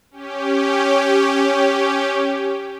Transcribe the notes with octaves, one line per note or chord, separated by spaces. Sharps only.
C#4 G4